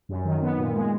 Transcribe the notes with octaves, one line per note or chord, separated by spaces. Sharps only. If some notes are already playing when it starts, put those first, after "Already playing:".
F#2
D#3
B3
A#2
G#3